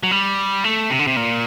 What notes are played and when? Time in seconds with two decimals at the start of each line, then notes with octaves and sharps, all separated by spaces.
0.03 F#3
0.11 G3
0.64 A3
0.90 C3
0.99 D3
1.07 C3
1.17 A#2